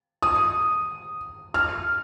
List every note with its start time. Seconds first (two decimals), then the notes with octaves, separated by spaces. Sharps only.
0.22 D#6
1.54 F6